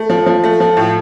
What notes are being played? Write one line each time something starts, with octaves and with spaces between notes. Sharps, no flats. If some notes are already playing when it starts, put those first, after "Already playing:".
Already playing: A3
F3
F3
A3
F3
A2